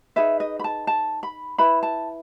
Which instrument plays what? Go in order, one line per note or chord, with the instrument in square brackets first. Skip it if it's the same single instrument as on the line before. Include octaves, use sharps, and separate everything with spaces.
[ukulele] D#4 G#4 B4 E5
D#5
B5
A5
A5
B5
E4 B4 B5
A5